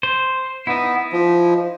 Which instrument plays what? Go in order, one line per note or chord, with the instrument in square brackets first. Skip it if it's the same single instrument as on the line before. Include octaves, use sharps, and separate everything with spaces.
[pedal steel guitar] C5
[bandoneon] B3 [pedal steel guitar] D#4 E4
[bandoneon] F3